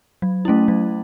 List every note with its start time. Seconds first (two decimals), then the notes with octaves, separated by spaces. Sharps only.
0.22 F#3
0.45 A3 C#4 E4
0.68 F#3